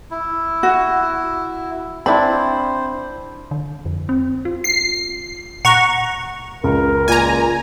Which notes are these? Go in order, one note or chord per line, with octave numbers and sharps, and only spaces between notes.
E4
F#4
C4 D4 E4 C5 B5
D3
F2
C4
F4
C7
A#2 F#5 A#5 C#6
C#2 A#4
A#2 G#5 A#5